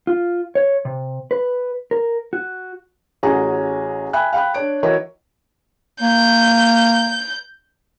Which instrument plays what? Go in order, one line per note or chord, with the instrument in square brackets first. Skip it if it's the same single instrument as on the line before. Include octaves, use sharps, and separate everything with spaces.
[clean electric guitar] F4
C#5
C3
B4
A#4
F#4
[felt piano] A1 C#4 F#4 G#4 G#5 A#5
E5 G5 G#5 B5 F#6
F5 G5 B5 F#6
D4 C#5 D7
E3 E4 F#4 A#4 C#5 D#5
[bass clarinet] A#3 [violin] G6